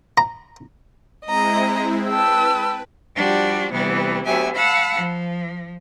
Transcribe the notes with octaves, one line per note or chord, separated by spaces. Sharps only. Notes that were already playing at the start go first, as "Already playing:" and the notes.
A#5
G#3 C4 E4 D#5 A#5
B4 G5 A5 E6
F3 G3 D4 F#4 G4
D2 C3 E3 G3 B3
D2 F#3 B3 G4 E5 G#5
F5 F#5 A5 B5 E6
F3